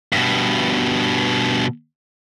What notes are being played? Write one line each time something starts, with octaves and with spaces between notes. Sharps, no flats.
G2 B2